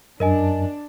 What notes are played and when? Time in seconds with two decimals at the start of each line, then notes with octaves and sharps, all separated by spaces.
0.20 F#2 D4 A#4 D#5 G#5